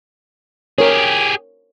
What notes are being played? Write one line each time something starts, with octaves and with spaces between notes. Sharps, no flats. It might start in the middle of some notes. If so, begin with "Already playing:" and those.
G4 G#4 A#4 C#5